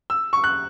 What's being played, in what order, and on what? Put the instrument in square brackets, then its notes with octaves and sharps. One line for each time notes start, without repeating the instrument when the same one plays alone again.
[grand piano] E6
C#6
F#6